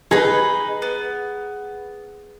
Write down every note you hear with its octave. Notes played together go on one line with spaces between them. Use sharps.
D#4 G#4 B4
B3